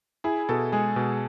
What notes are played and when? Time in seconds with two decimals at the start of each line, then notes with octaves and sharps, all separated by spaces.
0.24 E4 G#4
0.49 B2 A4
0.72 G#3 G#4
0.96 B2